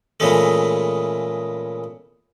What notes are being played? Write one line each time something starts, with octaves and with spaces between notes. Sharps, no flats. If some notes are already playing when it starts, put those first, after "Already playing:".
A#2 C#3 E3 G#3 A3